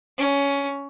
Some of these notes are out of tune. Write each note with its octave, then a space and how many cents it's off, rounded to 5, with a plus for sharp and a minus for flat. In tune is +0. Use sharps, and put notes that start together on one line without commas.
C#4 +15